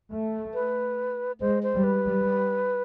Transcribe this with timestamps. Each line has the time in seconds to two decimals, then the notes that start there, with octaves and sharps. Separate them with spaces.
0.11 A3
0.54 B4
1.40 G#3 C5
1.63 C5
1.74 G3
1.84 B4
2.06 G3